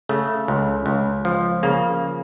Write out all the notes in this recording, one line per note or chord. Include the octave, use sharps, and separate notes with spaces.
C#3 A3
C#2
C#2
F3
C#3 A#3